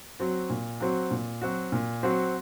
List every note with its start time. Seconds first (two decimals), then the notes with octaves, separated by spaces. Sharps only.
0.19 F#3 C4 F#4
0.50 A#2
0.80 F#3 C4 F#4
1.11 A#2
1.41 F#3 C4 F#4
1.72 A#2
2.03 F#3 C4 F#4